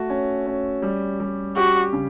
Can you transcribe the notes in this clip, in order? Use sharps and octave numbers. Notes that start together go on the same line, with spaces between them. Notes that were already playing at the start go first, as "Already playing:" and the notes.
Already playing: A3 F#4
C#4
C#4
G3
G3
F#4 G4
C#3